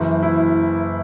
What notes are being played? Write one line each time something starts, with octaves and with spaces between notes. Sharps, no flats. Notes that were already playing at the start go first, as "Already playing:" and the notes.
Already playing: F#1 F#2 E3
E4